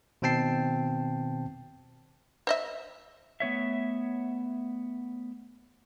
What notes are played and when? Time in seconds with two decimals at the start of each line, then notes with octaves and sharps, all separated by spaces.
0.22 B2 D#3 C4 G5 A5 C7
2.47 C5 D#5 E5
3.40 A3 B3 C#5 E5